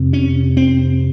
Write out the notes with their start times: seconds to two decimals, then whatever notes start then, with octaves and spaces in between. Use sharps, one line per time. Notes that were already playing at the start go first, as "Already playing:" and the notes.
Already playing: F2 C3
0.13 C#4
0.57 C4